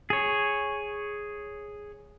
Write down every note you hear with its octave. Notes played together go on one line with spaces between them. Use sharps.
G#4 C#5